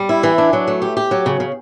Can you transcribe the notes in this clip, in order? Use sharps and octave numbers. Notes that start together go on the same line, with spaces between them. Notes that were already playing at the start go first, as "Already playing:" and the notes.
Already playing: G3
E4
E3
D4
F#3
A3
G4
G4
F#3
C#3
C#3